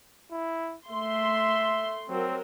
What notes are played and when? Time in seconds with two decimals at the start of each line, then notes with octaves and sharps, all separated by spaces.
0.32 E4
0.88 A3 E5 C6
2.09 F#3 C4 A#4